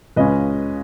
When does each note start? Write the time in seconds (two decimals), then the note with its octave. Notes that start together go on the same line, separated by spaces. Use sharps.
0.16 C#2 C#3 G#3 C#4 B4 D#5